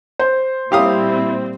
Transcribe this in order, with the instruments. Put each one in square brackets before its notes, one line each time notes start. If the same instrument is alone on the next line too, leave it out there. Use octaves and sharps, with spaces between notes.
[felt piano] C5
[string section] A#2 G3 C4 [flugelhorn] E4 [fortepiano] G4 F5 D#6